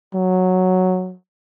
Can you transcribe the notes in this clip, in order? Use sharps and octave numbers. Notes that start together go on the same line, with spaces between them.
F#3